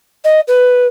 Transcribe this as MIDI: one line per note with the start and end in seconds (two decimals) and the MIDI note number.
0.24 0.40 75
0.47 0.86 71